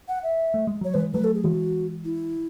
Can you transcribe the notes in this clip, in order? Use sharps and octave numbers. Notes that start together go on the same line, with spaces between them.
F#5
E5
A3
G#3
F#3 C#5
E3 G#3 B4
F#3 A3 B4
A4
G#4
E3 G#3 F#4
E4